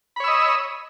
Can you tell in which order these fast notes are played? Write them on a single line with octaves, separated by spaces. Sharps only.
B5 C#5 E6 D#5